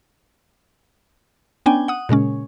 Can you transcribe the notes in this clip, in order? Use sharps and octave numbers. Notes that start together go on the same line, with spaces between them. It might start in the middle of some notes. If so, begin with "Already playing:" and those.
B3 C#4 D4 G5 G#5
F#5 D#6
A#2 C#3 G#3 C#4